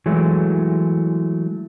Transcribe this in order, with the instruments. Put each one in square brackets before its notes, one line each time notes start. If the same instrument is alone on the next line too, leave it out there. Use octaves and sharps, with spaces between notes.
[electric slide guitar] E3 F#3 G#3 A3